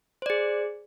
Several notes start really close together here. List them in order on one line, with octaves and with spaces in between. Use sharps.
C5 D5 G#4